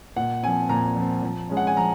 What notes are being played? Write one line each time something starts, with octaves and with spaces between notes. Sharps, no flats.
A#2 F#5
F3 C4 G#5
A#2 A#5
F3 C4
F3
G#3 C#4
F#5
G#5
F3 A#5